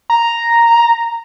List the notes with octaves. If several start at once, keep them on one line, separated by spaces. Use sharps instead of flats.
A#5